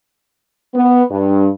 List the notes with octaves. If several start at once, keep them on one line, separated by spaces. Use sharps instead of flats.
B3
G2